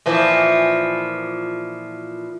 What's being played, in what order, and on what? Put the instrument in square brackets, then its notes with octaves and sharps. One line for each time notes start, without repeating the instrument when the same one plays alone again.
[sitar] A#2 E3 F3